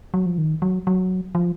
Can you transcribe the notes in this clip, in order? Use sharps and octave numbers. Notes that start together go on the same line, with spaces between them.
F#3
F3
D#3
F#3
F#3
F3